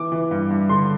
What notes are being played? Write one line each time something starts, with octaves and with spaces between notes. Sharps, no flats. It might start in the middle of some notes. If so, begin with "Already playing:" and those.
Already playing: E3 D6
E3
G2
G2
D3 C6